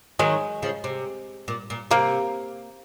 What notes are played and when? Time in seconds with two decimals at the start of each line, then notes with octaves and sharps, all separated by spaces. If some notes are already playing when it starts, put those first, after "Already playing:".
0.19 D#3 F#3 G#3
0.62 C#3 F3
0.84 C3
1.48 A#2
1.70 A#2
1.91 C3 A#3